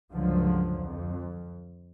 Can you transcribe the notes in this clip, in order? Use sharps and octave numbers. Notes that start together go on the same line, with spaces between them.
C#2 G2 D3 F3 F#3
F2